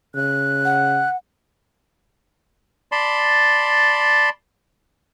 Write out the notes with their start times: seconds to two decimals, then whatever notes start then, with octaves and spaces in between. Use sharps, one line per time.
0.15 C#3 F#6
0.65 F#5
2.92 D5 A5 B5 C6